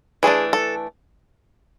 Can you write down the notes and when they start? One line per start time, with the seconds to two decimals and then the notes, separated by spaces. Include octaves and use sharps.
0.23 E3 A3 D4 G#4
0.53 A4